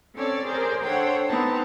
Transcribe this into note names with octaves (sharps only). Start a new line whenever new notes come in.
C4 C#4 A4 C#5 D5
G#4 A#4 C5 D5
D4 A4 C5 C#5 F#5 G5
B3 C4 D#4 A5